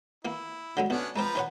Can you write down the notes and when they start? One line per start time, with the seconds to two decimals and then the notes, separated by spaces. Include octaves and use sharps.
0.25 E3 A#3 E4
0.77 D3 F#3 G#3
0.90 B1 B2 B3 C#4 D4
1.16 F3 G#3 C4 B4 A#5
1.35 D#3 C#5 F#5